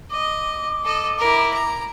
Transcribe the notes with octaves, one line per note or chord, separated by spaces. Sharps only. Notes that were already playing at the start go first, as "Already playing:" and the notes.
D#5 D6
A4 D#5
E4 A#4
A#5